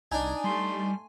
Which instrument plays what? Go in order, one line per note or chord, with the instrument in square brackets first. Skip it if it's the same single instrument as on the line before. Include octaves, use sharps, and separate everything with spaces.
[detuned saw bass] C2 [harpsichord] D4 D#4 [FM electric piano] G#5
[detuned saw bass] G3 [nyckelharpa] A3 C6